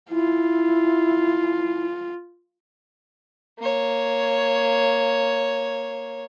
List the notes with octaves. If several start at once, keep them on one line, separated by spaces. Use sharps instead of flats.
E4 F4
A#3 C#5